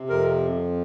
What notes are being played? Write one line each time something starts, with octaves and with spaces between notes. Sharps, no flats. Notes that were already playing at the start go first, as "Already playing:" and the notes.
Already playing: C3
F2 A#4